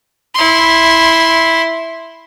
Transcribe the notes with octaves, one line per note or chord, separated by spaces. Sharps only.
E4 C6